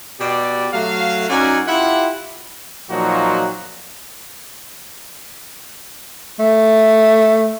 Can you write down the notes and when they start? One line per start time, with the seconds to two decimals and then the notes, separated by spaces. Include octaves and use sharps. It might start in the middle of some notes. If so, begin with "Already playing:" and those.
0.19 B2 G4 D5
0.73 F#3 A3 F5
1.29 F#2 C#4 D#4 F#4 D5 G#5
1.67 E4 F4 G4 E5 F#5
2.90 A#2 F3 F#3 A#3 D#4 F#4
6.39 A3